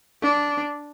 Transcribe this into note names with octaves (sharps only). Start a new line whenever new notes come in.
D4